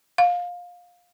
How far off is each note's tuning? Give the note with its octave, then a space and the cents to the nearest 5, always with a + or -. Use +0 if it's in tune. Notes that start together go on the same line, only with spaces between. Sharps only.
F5 +20